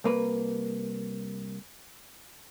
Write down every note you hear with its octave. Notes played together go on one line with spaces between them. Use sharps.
C2 A#3 B4